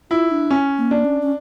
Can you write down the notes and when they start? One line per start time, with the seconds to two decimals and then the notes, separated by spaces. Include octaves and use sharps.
0.10 E4 F4
0.31 D4
0.51 C#4
0.78 A#3
0.91 D4
1.05 C#4
1.22 C#4